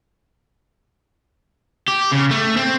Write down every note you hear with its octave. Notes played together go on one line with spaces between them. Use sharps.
G4
C#3
A3
C4